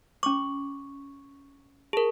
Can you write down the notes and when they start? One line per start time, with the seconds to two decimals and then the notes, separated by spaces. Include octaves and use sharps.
0.23 C#4 C#6 D6
1.93 G#4 A#4 A5